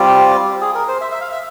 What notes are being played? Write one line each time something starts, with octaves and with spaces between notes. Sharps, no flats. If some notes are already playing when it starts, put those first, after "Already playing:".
Already playing: G3 C4 F4 G4
G#4
A#4
C5
E5
E5
F5
E5